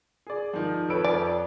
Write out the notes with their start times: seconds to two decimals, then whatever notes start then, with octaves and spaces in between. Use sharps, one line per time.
0.27 G#4 D5
0.53 D#3 F3
0.88 F2 A4 B4 C#5 E6 D7
1.04 F2 D5